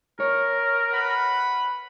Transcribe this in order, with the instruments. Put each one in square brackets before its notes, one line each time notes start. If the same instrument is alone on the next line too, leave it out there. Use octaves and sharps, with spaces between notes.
[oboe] A#4 [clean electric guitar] C#5
[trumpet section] B4 F#5 B5